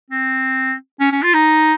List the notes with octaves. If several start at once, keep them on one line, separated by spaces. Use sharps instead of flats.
C4
C#4
C#4
F4
D#4